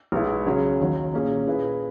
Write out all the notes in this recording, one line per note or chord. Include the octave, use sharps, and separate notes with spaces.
B1 B2 G#3 B3 E4
C#3 F#3 C#4 G#4 C#5
D#2 D#3 F#3
A#2 A#3 C#4 G#4
A#2 A#3 E4 G#4 B4